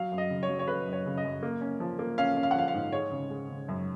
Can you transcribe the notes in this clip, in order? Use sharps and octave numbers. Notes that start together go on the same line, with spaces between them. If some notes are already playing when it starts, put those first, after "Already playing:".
Already playing: F#3 F5
F#2
D#5
C#3
C#5
F#3
C#5
C#3 B4
F#2
C#5
C#3
D#5
F#2
A#3
C#4
F3
A#3
C#4 F5
C#4
F5
F#5
F3 F5
F5
G#2
G#3 C#5
C#3
G#3
C#3
F#2